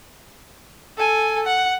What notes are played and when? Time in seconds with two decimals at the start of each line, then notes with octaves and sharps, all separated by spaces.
0.97 A4 G#5
1.46 F#5